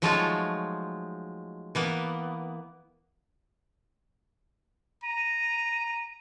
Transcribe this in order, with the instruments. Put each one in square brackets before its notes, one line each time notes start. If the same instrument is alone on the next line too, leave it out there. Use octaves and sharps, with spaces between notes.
[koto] F3 F#3 G#3 A3 D#4 F4
E3 A#3 B3
[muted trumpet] A#5 [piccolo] D#7